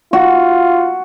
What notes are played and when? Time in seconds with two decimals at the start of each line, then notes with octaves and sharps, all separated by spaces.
0.13 F4 F#4